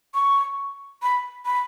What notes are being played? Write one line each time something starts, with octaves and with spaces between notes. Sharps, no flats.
C#6
B5
B5